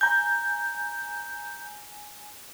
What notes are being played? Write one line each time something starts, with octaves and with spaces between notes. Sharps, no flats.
G#5 A#5 G6